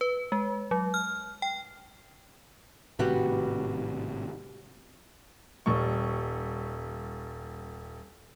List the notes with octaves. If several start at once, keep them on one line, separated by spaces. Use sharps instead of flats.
B4
G#3
F#3
F6
G5
G#1 A2 C3 G3 F#4 B4
D#1 G3 C#6